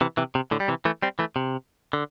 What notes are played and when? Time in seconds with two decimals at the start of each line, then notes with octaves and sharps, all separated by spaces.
0.01 C3 E3
0.17 C3 E3
0.35 C3
0.51 A2 D3
0.60 G3
0.68 C3 E3
0.85 E3 A3
1.02 G3 C4
1.19 E3 A3
1.36 C3
1.93 D3